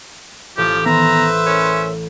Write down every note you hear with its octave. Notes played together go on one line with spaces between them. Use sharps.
A1 F3 G4
D#3 E3 B3 B4 C5 E5 A#5
C#4 A#4 C#5